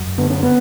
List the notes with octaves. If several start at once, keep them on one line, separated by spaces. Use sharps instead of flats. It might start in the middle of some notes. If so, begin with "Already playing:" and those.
Already playing: F#2
D3 B3
C#4
B3